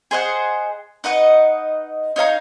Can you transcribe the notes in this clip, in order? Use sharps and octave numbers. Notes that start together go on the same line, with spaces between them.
G#4 C5 D#5 F#5
D#4 B4 D#5 F#5
D#4 C#5 F5 A#5